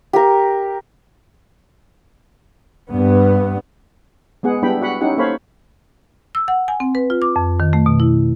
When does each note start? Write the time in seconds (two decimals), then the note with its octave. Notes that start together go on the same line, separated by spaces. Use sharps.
0.13 G4 A#4
2.91 G2 B3
4.43 G#3 B3 G#4 F#5
4.62 G3 B3 D4 E4 G5 B5
4.82 F#4 F#5 B5
5.01 C#4 D#4 E4 G4 F#5
5.18 A#3 A4 C5 C#5 F5 B5
6.35 E6
6.48 F#5
6.68 G#5
6.80 C4
6.95 B4
7.10 F4
7.22 D6
7.36 F2
7.60 D#3
7.73 A3
7.86 B2
8.00 E4